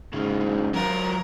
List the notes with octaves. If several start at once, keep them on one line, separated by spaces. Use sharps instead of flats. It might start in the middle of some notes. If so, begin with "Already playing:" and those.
D#2 G#2 C#3
F#3 F4 A#4